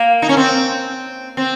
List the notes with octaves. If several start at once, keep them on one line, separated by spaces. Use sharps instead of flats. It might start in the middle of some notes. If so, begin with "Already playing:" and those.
Already playing: A#3
D#4
C#4
C4
C4